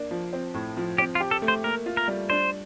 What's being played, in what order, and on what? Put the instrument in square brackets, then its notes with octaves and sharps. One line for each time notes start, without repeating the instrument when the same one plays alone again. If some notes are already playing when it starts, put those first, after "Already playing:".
Already playing: [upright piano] A#3 D4
F3
C4
A2
F3
[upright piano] C4 [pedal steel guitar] G4
[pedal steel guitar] F4
[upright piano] G4
[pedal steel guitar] A4
[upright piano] A3
[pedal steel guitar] C5
[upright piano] A#3 [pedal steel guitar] A#4
[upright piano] F4
[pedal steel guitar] A#4
[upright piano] G3
[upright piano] D4 [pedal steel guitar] C5